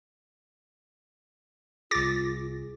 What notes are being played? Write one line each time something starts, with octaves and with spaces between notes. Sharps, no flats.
C2 F4 G#4 D6 A6 A#6